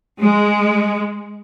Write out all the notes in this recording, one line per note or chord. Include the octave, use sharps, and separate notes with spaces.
G#3